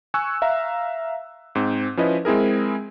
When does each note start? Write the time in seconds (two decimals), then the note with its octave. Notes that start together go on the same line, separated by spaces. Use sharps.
0.14 G#5 C#6 E6 F#6
0.42 E5 F5 A#5
1.55 G#2 C4
1.97 F3 C#4 E4 B4 D#5
2.25 G#3 C4 E4 G#4 A#4